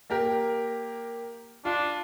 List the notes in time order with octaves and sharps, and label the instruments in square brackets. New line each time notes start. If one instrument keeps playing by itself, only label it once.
[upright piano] A#3 G4 A#4
[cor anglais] D4 [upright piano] F4